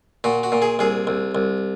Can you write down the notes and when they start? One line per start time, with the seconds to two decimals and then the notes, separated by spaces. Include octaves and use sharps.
0.24 A#2 F#4
0.43 F#4
0.52 A#2
0.62 G#4
0.79 C2 G#4
1.07 C2
1.35 C2